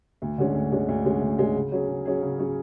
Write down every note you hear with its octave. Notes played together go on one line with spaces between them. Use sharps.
D2
D3 G#3 C#4
D2
D3 G#3 C#4
D2
D3 G#3 C#4
D2
D3 G#3 C#4
C#3
F#3 C#4 G#4
C#3
F#3 C#4 G#4
C#3
F#3 C#4 G#4